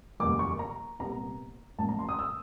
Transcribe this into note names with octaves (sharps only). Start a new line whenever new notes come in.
F#1 E2 B2 G3 A#3 D6
C#6
A#5
C2 A#2 G3 B3 A#5
A1 A2 F3 A#3 A5
A#5
C6
D#6
E6